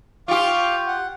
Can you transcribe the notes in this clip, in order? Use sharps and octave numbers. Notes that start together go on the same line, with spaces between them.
F4 G4 F5 C#6 D6
F#5